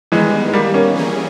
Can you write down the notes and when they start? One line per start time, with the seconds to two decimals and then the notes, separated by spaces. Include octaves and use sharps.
0.12 D#3 E3 G3 G#3 B3 D#4
0.48 G#3
0.54 G3 A#3
0.74 A#3 C#4
0.95 E3 G3 A#3 C#4 G#4